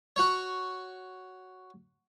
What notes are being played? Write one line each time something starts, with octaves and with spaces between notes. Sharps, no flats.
F#4 C#5